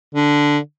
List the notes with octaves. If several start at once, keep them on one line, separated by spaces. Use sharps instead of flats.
D3